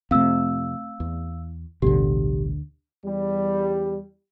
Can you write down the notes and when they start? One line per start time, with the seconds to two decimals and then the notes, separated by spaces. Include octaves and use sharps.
0.11 F2 C3 A3 C4 F5 E6
1.00 E2
1.82 A1 D2 G2 B2 D3 G4
3.04 E2 G3